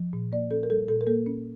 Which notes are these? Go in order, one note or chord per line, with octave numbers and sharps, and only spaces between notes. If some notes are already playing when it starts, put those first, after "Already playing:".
Already playing: F3
A#2
A#3 D5
C#4 A4
A#4
G3 A4
A#2 A4
A#4
A#3 A4
C#4